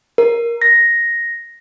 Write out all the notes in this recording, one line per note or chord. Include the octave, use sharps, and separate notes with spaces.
A#4
A#6